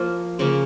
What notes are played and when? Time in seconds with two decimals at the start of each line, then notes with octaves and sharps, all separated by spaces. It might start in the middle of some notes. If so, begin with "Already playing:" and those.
Already playing: F3 A#3 F4
0.39 C#3 F3 A#3